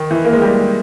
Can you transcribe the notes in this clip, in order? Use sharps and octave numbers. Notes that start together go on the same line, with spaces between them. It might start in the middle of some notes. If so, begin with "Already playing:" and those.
Already playing: D#3
E3
A#3
G#3
G3